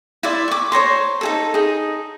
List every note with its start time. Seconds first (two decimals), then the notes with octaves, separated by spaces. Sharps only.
0.23 E4 C5 D5 E5
0.48 C#6 D6
0.72 C5 C#5 A#5 C6
1.21 D#4 G#4 A4
1.54 D#4 G#4